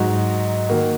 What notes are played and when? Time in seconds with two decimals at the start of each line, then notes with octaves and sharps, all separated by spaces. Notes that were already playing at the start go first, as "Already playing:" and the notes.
Already playing: G#2 F#3 D#4 F#4
0.69 D#3 A#3 F#4